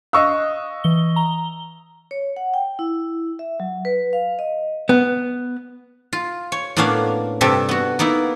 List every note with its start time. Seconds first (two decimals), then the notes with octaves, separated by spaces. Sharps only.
0.13 D#5 F5 C#6 D#6 E6 F#6
0.84 E3 G7
1.16 A#5 G7
2.11 C#5
2.37 F#5
2.54 G5
2.79 E4
3.39 E5
3.60 F#3
3.85 B4
4.13 F5
4.39 D#5
4.89 B3
6.13 F4
6.52 C#5
6.76 A2 A#3 B3 C#4 D4 F5
7.41 G2 C3 G4 A4 E5
7.69 B3 F#4
7.99 A#3 B3 D#4 E4